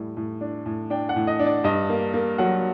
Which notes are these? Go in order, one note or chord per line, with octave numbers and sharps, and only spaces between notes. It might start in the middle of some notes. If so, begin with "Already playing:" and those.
Already playing: A2 G3
A2
D4
A2
D4 G5
F#5
A2
D#5
D4
D5
G2 D#5
A#3
A#3
F#3 F#5